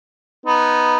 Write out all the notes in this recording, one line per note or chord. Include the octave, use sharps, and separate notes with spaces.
B3 D#4